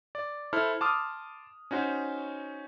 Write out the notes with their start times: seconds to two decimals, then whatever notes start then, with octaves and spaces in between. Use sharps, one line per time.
0.15 D5
0.53 E4 A4 C5 F6
0.81 A5 C6 D6 D#6 F6
1.71 C#4 D#4 F#4 C5